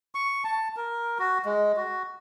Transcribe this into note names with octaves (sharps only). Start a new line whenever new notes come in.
C#6
A5
A#4
F#4
G#3
F#4